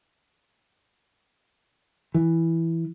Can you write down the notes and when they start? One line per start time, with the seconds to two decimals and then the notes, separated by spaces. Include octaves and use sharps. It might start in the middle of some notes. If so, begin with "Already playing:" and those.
2.14 E3